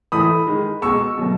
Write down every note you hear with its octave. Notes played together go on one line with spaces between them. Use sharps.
A2 E3 A3 B5 D#6
D#3 G#3
B2 G#3 C#6 E6
B2 F#3 A3